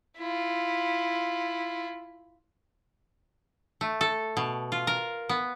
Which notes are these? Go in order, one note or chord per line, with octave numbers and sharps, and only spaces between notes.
E4 F4
A3
A4
B2
F4
A#4
B3